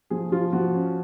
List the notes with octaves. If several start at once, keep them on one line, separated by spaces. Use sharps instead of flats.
F3 G#4
F3 F4
F3 F#4
C#4